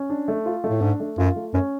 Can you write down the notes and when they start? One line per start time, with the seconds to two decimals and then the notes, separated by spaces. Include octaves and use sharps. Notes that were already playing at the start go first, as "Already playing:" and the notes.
Already playing: C#4
0.10 D4
0.28 A3
0.46 F4
0.64 A3
0.70 A2
0.81 G#2 D4
1.00 A3
1.18 F#2 F4
1.36 A3
1.54 F#2 C#4